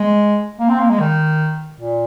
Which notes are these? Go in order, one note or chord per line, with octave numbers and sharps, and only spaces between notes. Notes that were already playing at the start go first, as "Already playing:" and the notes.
Already playing: G#3
A#3
C4
A#3
G#3
D#3
A#2